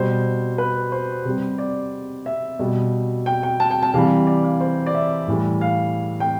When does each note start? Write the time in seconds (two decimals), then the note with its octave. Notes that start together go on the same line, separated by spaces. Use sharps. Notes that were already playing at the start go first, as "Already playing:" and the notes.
Already playing: B2 G3 C5
0.58 B4
0.92 C5
1.25 C3 G3
1.58 D5
2.26 E5
2.59 B2 G3
3.26 G5
3.43 G5
3.60 A5
3.71 G5
3.83 A5
3.94 C3 E3 G3 F5
4.27 D5
4.44 F5
4.61 C5
4.86 D5
4.94 E5
5.27 A2 E3 G3
5.61 F5
6.20 G5